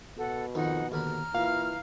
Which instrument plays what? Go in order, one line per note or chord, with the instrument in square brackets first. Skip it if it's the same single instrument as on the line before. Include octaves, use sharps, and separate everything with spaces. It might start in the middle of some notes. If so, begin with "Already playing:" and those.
[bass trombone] B2 [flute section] A4 F#5
[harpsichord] F2 D#3 [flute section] D#4 F#5
[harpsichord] D#2 D3 B5 [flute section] A#5 F6
[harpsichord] A#2 [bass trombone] E3 [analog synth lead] F5